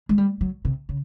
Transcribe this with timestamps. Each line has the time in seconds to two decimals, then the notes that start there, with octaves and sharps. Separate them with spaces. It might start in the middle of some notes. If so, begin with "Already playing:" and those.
0.09 G#3
0.18 G3
0.41 F#3
0.65 C3
0.89 C#3